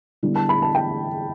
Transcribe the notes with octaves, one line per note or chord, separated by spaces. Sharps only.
D3 G3 B3 E4
A5
B5
A5
G5